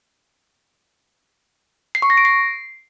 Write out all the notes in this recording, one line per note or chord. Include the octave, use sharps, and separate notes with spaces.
C7
C#6
A#6
D7
C7